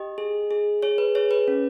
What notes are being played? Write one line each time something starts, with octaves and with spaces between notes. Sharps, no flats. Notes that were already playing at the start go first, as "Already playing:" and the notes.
Already playing: G4 D#5
G#4
G#4
G#4 C#5
B4
G#4 C#5
B4
C#4